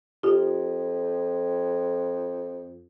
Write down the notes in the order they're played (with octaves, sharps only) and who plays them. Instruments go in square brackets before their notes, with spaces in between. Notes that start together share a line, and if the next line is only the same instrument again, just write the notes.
[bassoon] F2 [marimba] F4 G4